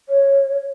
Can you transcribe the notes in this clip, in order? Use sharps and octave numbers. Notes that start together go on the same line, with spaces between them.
C#5